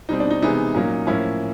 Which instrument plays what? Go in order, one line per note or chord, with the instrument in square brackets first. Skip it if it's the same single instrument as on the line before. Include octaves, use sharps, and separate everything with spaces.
[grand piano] B2 G3 C4 D#4
D4
D#4
C3 E3 G#3 B3 D#4
A#2 F#3 A#3 C#4
A2 F3 A#3 C#4 E4